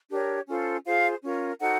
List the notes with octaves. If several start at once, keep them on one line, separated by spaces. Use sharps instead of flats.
D4 G4 A#4 C#5
C#4 F4 A4 C5
F4 G#4 C5 F5
C#4 F4 A#4
D#4 F#4 A4 C5 F#5